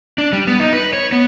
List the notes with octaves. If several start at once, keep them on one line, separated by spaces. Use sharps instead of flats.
D4
G3
B3
D#4
B4
C#5
B3